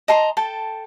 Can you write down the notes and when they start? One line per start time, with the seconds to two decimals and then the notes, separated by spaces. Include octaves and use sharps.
0.08 D#5 A5 A#5 C6
0.37 A4 G5 A5